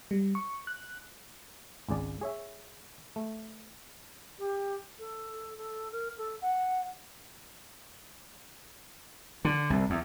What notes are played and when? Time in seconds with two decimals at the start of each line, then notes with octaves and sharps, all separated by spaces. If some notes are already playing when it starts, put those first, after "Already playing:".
0.11 G3
0.35 C#6
0.67 F#6
1.89 G#1 C#2 G#4 D5
2.21 G#4 C#5 E5
3.16 A3
4.38 G4
4.99 A4
5.57 A4
5.92 A#4
6.18 A4
6.41 F#5
9.45 D3
9.70 C2
9.90 E2